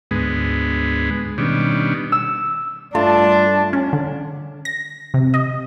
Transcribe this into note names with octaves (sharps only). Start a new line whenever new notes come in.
D2 G#2 G#3 B3
B2 D#3 G3 C#4 D4
E6
G2 A3 D4 F4 A5
C#4
D3
A#6
C3
D#5